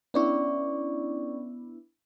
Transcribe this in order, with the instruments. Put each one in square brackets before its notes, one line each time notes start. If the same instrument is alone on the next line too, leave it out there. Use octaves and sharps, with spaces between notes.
[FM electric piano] B3 D4 E4 [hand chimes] C#4 D5 C#6